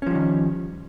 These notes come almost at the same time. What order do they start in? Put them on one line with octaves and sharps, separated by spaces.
C#4 F3 G3 D#3